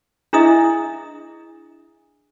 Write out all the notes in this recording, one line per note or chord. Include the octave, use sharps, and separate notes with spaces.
D4 E4 G#4 D#5 E5 D#6